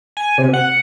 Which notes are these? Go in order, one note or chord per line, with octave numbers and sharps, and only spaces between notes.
G#5
C3
F#5